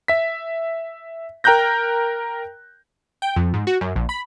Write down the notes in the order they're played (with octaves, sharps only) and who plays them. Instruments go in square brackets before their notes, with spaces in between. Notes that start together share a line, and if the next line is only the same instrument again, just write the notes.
[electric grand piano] E5 B6
A#4 G5 A#5 F#6 G6 A#6
[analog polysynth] G5
F2
G#2
F#4
F#2
A#1
B5